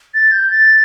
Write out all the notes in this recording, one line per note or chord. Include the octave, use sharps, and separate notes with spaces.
A6
G6
A6